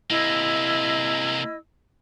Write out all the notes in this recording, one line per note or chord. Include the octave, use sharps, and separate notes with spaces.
C3 A#3 E4 D#5 E6